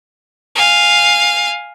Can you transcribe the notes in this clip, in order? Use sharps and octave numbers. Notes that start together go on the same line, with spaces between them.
F5 G#5